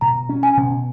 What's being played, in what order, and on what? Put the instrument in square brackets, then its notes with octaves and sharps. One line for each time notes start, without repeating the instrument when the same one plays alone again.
[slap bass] B2 [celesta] A#5
[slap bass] C#4
[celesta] G#5
[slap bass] B2